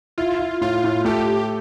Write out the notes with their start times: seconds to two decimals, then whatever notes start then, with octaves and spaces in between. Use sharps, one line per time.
0.18 E4 F4
0.39 E4
0.61 A2 F4
0.84 A2
1.05 A3 G4